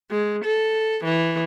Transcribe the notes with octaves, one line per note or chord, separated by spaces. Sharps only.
G#3
A4
E3